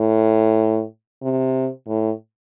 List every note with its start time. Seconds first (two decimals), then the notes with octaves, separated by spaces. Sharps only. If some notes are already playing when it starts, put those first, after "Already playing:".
Already playing: A2
1.22 C3
1.88 A2